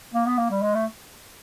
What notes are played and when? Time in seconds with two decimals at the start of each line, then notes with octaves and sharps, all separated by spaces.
0.14 A#3
0.26 B3
0.38 A#3
0.50 G3
0.62 G#3
0.75 A3